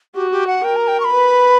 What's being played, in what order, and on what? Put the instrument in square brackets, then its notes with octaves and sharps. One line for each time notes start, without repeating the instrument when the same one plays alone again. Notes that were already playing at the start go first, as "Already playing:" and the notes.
[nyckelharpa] F#4 [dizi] G4
[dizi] G4
F#5
[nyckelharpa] A#4 [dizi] G5
[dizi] A#5
G5
C#6
B5
[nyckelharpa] B4